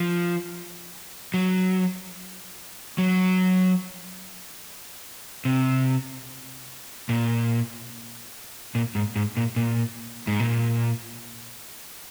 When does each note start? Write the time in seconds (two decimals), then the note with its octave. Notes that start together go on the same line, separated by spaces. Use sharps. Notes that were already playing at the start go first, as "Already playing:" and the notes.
Already playing: F3
1.34 F#3
2.98 F#3
5.45 C3
7.09 A#2
8.75 A#2
8.95 G#2
9.16 G#2
9.37 A#2
9.56 A#2
10.27 G#2
10.40 A#2